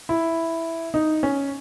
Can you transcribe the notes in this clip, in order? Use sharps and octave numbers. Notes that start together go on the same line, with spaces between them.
E4
D#4
C#4